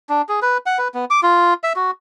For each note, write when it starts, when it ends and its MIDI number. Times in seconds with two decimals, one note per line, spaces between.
0.09 0.22 62
0.29 0.40 68
0.42 0.58 71
0.66 0.78 78
0.78 0.88 71
0.94 1.05 59
1.10 1.20 86
1.23 1.54 65
1.64 1.73 76
1.76 1.91 66